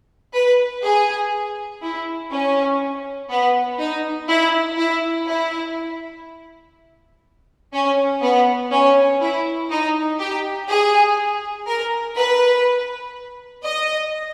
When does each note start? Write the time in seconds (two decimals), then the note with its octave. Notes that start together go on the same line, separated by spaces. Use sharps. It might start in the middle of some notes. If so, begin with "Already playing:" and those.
0.34 B4
0.84 G#4
1.82 E4
2.31 C#4
3.30 B3
3.79 D#4
4.28 E4
4.77 E4
5.27 E4
7.73 C#4
8.22 B3
8.72 C#4
9.21 E4
9.70 D#4
10.19 G4
10.69 G#4
11.67 A#4
12.16 B4
13.64 D#5